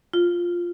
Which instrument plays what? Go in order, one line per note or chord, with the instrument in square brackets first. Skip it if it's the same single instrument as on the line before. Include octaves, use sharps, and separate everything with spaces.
[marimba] F4